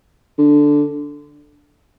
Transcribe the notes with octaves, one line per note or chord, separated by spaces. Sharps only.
D3